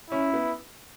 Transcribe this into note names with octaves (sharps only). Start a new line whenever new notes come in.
C#4 E4
B3